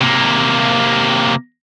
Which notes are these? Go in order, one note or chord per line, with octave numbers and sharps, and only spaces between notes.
C3 A#3